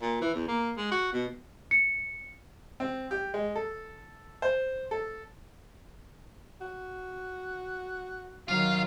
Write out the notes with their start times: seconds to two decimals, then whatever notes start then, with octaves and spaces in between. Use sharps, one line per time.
0.02 A#2
0.21 E3
0.34 E2
0.48 A#3
0.77 G#3
0.91 F#4
1.13 B2
1.71 C#7
2.80 C4
3.11 G4
3.34 G#3
3.56 A4
4.42 C5
4.91 A4
6.61 F#4
8.48 D#3 F#3 F4 F5